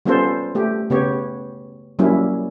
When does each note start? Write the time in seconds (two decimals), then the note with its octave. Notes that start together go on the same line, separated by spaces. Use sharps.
0.06 G3 B3 C#4 F4 A4 C5
0.55 A3 G4
0.90 C#3 B3 G4 C#5
1.99 F#3 G3 A#3 C#4 E4